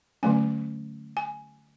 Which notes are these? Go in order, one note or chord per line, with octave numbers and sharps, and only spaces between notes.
D3 F#3 A3 C#4 G#5
G#5